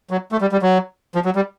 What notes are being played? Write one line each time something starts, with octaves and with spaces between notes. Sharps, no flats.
F#3
A3
G3
G3
F#3
F3
F#3
G3